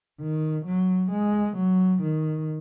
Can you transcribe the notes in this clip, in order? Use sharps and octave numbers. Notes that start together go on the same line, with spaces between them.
D#3
F#3
G#3
F#3
D#3